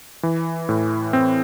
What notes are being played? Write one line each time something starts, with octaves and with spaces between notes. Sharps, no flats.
E3
A2
C4